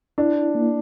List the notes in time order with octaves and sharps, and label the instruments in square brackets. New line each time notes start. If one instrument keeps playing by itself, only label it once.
[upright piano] D4 [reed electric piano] E4
[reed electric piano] A#3